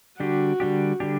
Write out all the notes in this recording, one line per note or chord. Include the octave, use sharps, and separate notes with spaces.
D3 G3 D4 F#4 G4
D3 G3 D4 G4
D3 G3 D4 G4